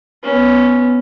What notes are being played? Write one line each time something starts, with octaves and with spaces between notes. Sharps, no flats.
B3 C#4